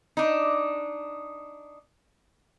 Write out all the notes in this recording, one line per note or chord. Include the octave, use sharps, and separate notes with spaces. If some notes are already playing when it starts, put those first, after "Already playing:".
D4 D#4